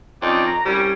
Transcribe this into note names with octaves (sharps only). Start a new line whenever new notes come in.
F2 C#4 D#4 D5
A#5
C2 G3 C#4